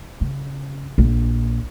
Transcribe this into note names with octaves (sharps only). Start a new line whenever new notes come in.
C#3
A#1